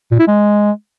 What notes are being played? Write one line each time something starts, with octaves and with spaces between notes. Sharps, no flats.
A#2
E4
G#3